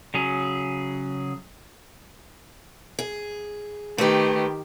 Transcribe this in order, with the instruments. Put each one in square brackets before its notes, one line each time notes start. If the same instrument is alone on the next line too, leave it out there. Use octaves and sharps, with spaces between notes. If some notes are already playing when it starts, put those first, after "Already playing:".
[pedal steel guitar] C#3 F#3 G#4
[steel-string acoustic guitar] G#4
[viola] D#3 G4 [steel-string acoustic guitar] A3 B4